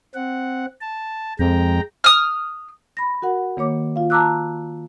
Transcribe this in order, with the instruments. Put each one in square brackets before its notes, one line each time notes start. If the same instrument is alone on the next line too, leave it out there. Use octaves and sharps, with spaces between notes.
[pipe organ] C4 F#5
A5
[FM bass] F2 [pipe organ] G#3 G5 A#5
[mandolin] D#6 F6
[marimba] B5 A#6
F#4 A#4 F#5
D#3 A#3 C#5 D6
F4 F5
A5 A#5 D6 E6 F#6